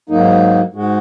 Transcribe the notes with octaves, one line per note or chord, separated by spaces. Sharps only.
G#2 F#3 A#3 D#4
G#2 G#3 F#4